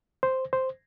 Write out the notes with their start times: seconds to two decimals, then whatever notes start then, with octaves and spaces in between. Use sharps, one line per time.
0.23 C5
0.53 C5